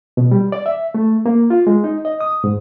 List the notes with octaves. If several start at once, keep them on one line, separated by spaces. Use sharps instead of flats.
B2
G3
D5
E5
A3
A#3
F4
G#3
D#4
D#5
D#6
G#2